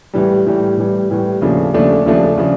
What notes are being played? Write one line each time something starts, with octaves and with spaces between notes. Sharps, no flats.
A2 E3 G3
A2 E3 G3
A2 E3 G3
A2 E3 G3
D#2 C#3 F3 A3 D4
D#2 C#3 F3 A3 D4
D#2 C#3 F3 A3 D4
C#3 F3 A3 D4